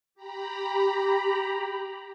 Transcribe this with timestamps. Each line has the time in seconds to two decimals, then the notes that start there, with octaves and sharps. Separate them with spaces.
0.15 G4 A#5 B5